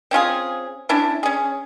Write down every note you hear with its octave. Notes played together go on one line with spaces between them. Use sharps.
C4 C#4 F4 G#4
C#4 D4 E4
C#4 G#4